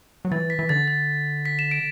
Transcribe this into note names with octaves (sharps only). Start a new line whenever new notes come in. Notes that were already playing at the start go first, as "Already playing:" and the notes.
F#3
E3 A6
B6
E3
D3 A6
A6
B6
E7
D7